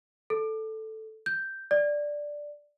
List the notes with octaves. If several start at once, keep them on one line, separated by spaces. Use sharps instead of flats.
A4
G6
D5